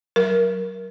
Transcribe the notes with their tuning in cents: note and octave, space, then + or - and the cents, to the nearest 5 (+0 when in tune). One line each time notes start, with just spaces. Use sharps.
F#3 +25 A#4 +15